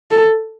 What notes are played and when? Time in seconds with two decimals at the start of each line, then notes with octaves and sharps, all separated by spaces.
0.11 A4